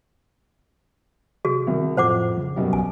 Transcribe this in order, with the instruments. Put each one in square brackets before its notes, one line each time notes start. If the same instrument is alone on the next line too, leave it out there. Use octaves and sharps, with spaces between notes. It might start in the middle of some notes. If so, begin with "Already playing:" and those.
[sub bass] C3 [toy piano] F#4 G#4
[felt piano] C2 [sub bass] D#3
[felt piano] F2 [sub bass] A2 [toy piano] C5 F#5 D6
[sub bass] C#3
[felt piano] F#2 B2 G3
[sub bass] A1 [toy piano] G#5